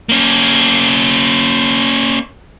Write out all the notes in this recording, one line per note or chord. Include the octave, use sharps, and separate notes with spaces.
A#3 C#4